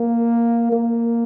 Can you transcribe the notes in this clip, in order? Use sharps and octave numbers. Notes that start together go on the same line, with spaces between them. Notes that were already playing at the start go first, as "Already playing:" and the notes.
Already playing: A#3
A#3